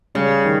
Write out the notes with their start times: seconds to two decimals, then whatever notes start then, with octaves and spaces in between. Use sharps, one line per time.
0.15 C#3 G3
0.44 D#3